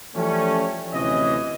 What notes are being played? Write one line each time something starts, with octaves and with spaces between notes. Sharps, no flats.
E3 F3 G3 A3 C#4
D2 C3 E3 C#4 D#5